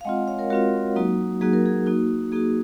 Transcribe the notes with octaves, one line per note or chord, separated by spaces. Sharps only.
F5
G#3 C4 F4 D#5 F#5
C#5 F5
A#4 C#5
G#3 C4 F4 F#4 A#4
F#3 A#3 D#4 F#4
F#3 A#3 D#4 F#4 G#4
A#4
G#4
A#3 D#4 F#4
A#3 D#4 F#4 G#4